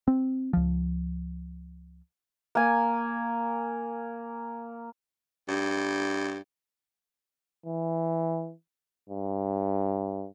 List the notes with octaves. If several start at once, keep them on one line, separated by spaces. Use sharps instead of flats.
C4
C#2 F3
A#3 G#5
G2
E3
G2